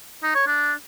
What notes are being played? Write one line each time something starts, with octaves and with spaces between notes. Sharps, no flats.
D#4
C#5
D4